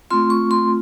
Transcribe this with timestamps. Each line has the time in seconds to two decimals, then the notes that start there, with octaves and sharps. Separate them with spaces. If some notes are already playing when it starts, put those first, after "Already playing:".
0.11 A3 C4 F4 C6
0.30 C#6
0.51 C6